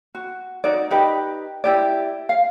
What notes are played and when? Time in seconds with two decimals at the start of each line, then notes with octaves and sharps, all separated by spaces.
0.15 F#4
0.64 D#4 F#4 D5
0.91 D#4 G4 B4 D#5
1.64 E4 G4 D5
2.29 F5